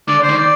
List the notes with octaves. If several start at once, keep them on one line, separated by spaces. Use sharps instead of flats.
D3 D5
C5
D#3
D5